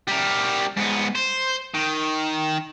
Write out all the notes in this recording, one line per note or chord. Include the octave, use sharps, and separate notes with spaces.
G3 A#4
G#2 B3
C5
D#3